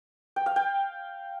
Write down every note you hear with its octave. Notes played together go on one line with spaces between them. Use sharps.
G5
F5
G5